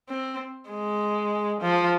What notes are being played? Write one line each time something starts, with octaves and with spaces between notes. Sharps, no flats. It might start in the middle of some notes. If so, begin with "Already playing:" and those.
C4
G#3
F3